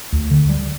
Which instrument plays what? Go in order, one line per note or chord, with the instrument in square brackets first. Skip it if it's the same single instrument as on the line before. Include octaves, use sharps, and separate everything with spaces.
[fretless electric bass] D2
D3
G3